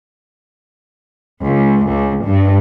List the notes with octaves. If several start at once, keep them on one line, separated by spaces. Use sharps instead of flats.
C#2
C#2
G2